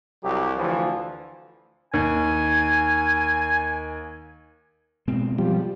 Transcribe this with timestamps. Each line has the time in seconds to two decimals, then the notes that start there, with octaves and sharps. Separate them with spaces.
0.24 C2 F#3 G4
0.57 D2 E3 F3
1.94 D#2 G#5
5.08 B2 G#3 C4
5.38 F3 G3